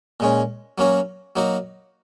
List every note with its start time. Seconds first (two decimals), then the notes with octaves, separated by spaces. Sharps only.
0.20 A#2 G#3 C#4
0.78 F#3 A#3 C#4 F#4
1.36 F#3 A#3 D#4 F#4